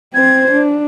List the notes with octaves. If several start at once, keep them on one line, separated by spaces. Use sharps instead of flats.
C4 C5 G#6
D4